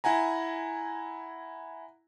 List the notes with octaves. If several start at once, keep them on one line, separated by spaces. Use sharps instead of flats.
E4 F#5 G#5 A#5